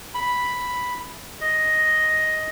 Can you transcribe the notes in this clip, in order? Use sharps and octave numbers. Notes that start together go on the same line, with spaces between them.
B5
D#5